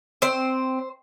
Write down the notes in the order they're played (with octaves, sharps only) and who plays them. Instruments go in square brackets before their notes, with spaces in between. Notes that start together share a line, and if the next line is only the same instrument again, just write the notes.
[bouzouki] C4 C5